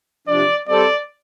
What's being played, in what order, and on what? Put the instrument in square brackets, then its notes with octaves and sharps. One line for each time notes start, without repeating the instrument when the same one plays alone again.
[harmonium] C3 F3 D4 [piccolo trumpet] D5
[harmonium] G3 C4 A4 C5 [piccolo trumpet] D5